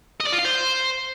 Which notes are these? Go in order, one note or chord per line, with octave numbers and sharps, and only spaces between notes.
D#5
D5
F4
F5
C5